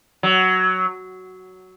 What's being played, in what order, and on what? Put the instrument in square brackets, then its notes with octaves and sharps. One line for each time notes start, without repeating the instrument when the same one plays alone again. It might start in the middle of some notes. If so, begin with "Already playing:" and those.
[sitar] F#3